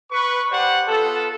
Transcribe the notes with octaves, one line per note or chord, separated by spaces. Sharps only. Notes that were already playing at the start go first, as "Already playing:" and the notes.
B4 C#6
G4 B4 C5 D5 F#5
B3 F4 A4